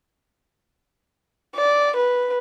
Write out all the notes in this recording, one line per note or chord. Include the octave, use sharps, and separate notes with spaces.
D5
B4